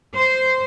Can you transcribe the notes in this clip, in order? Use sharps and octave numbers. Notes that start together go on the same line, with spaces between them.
C5